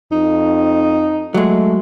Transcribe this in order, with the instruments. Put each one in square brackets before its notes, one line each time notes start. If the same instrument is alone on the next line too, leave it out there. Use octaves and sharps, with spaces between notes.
[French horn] F2 [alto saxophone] D#4
[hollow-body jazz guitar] F#3 G#3 [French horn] A3